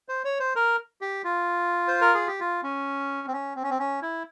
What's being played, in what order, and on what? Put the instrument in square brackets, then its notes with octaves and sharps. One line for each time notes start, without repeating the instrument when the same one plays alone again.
[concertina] C5
C#5
C5
A#4
G4
F4
C5
A#4
G#4
G4
F4
C#4
C4
C#4
C4
C#4
C4
C#4
E4